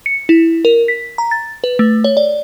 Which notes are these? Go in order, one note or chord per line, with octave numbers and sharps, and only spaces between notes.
C#7
E4
A#4
B6
A#5
A6
B4
A3
C#5
D5